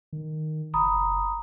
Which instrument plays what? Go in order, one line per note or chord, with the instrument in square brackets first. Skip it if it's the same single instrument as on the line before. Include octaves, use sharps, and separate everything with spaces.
[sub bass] D#3
[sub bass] F#1 [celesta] A#5 B5 D#6